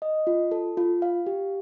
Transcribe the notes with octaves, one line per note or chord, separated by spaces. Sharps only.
D#5
F4
A4
F4
F5
G4